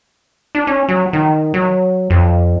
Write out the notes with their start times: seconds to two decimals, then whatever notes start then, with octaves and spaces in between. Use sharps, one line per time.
0.55 D4
0.67 C#4
0.89 F#3
1.13 D#3
1.54 F#3
2.10 F2